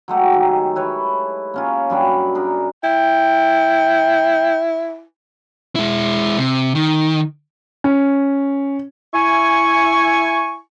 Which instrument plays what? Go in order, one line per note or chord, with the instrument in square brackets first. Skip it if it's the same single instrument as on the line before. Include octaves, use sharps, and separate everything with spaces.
[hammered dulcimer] F#3 G#3 A3 G4
D#3
E4 B4 C#5
A#3 C#4 F4
F#2 G3 D4 B5
D4 G#4 A#4
[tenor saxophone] E4 [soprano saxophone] G5
[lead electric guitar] G#3 E4
C3
D#3
[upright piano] C#4
[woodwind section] E4 G#5 C#6